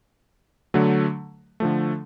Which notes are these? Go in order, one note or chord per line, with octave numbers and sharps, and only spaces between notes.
D3 F#3 A3
D3 F3 A3